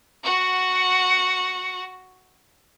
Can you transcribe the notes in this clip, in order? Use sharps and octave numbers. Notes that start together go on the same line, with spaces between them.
F#4 F#5